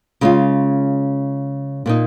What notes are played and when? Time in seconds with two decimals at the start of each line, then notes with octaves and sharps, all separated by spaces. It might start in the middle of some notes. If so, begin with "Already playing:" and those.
0.21 C#3 G#3 C#4 F4
1.86 A#2 A#3 D#4